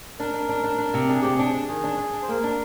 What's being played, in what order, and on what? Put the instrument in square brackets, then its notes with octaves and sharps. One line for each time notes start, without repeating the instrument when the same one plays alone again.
[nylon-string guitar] D4 [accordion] A#4
[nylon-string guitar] D4
D4
D4
D4
C3
[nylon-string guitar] D4 [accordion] G#4
[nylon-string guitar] C3 [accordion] G4
[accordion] G#4
[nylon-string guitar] D4
D4
[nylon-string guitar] D#3 [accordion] G#4
[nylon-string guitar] D4
D4
D4
[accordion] C5
[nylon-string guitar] A#3 [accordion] A#4
[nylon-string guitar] D4